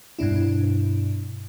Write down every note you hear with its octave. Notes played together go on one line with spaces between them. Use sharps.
G2 B2 D4 E4